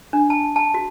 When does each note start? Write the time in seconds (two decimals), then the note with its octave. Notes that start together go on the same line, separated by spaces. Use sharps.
0.13 D4
0.30 A5
0.56 A5
0.74 F#4